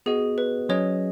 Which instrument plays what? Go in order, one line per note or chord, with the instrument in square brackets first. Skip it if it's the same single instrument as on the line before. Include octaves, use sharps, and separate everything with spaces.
[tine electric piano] B3 F#4 D#5 [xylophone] G#4
[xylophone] B4
[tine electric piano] F#3 C#4 G#4 D#5 [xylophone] C#5